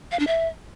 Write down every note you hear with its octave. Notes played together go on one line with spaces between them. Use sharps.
F5
D4
E5